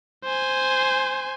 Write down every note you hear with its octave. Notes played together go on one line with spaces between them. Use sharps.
C5 G#5